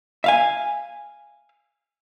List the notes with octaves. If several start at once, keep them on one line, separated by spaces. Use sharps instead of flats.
E5 F5 G#5